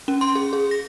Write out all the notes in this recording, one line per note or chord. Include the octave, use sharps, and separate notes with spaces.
C#4
C6
G#4
G#4
A#6